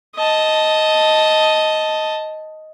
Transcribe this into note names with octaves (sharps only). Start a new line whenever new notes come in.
D#5 A5